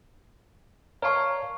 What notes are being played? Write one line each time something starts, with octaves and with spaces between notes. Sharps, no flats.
A#4 C#5 D5 F5 A5 C#6